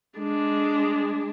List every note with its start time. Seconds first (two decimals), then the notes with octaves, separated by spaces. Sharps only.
0.19 G#3 D4